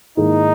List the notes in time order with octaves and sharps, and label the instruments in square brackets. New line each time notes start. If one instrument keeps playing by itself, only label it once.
[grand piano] G#2 D#3 A#3 E4 G#4 [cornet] D#4